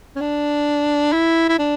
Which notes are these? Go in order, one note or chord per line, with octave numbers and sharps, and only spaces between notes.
C#4
D4
E4
E4
D4